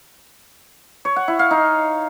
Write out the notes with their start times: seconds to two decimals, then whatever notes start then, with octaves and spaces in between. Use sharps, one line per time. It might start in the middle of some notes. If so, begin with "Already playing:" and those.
1.05 C#5
1.16 F#5
1.28 E4
1.39 F5
1.51 D#4